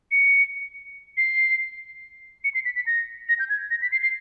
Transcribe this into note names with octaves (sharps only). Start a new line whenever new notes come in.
C#7
C7
C#7
C7
B6
B6
A#6
A#6
G6
G#6
A#6
B6
C7
C7